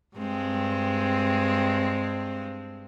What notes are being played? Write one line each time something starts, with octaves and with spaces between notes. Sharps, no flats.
G2 G#3 C4